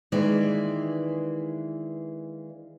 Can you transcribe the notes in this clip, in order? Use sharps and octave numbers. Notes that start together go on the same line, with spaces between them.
D#3 E3 G#3 A#3 B4 D5